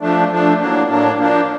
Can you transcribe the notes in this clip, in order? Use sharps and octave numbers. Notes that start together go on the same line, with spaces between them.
F3 A3 D4
F3 A3 D4
A2 F#3 A#3 D4
A2 F#3 A#3 D4
F3 A#3 D4